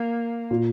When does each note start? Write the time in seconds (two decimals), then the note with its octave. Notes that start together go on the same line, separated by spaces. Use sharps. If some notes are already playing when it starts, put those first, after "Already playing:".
Already playing: A#3
0.51 A#2